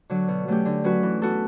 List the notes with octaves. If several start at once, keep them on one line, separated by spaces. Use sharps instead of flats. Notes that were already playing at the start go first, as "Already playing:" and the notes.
D3 F#3
B2
F#3 A3 C#4 G4
D3
F#3 C#4 F#4 B4
E3
B3 F#4 A4